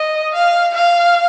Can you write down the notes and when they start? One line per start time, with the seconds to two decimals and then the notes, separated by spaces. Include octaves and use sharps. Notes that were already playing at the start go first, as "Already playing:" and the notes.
Already playing: D#5
0.33 F5
0.74 F5